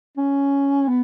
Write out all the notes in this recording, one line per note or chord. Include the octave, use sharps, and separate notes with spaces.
C#4
B3